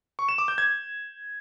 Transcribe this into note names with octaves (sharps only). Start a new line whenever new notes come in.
C#6
E7
D6
G6
G#6